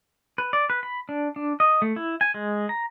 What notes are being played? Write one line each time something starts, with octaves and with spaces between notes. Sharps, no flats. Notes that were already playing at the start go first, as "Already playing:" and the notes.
B4
D5
B4
B5
D4
D4
D#5
A3
E4
G#5
G#3
A#5